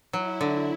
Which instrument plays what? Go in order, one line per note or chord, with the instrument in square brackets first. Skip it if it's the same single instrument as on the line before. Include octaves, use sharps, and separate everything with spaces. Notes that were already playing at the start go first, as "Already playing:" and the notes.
[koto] F#3 [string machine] E4
[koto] D3